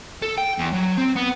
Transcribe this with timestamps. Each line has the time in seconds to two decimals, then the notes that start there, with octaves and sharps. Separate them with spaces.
0.22 A4
0.38 G5
0.58 E2
0.73 F#3
0.97 C4
1.16 B3